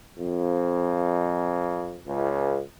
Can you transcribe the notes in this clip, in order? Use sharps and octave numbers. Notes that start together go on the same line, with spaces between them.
F2
C#2